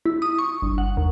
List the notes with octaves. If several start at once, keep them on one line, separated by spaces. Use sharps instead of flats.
E4
D#6
C#6
G1
F#5
D#2